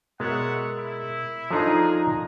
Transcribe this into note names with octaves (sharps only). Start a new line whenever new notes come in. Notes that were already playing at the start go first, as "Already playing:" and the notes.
B2 G#3 A#4 C#5 E5 F#5 A6
E4
F3 D4 D#4 G#4 A4 A#5 F6